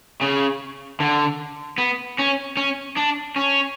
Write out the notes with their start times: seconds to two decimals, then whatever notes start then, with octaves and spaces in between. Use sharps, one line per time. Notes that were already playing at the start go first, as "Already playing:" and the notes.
0.21 C#3
1.00 D3
1.78 B3
2.19 C#4
2.57 C#4
2.97 D4
3.36 C#4